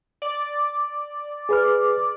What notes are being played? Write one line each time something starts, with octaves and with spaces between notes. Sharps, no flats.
D5
G#4 B4 F6